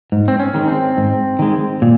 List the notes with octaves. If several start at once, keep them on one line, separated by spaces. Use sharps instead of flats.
G#2
C4
C#4
D#3 G#3
C4
G#2
D#3 G#3
A#2